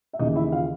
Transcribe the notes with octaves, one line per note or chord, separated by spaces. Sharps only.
E5
D#2 C#3 E3 D#4 D#5
E4 E5
F4 F5